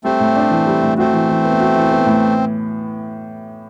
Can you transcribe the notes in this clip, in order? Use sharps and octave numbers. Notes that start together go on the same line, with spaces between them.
G3 A3 C4
A2
D4
E3
G3
A2
A3 C4 F#4
E3
E3
B3
F#4
E3
B3
A2